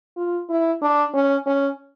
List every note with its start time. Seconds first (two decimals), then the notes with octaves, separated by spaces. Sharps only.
0.17 F4
0.50 E4
0.82 D4
1.14 C#4
1.47 C#4